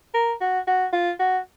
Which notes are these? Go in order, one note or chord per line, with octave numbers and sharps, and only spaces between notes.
A#4
F#4
F#4
F4
F#4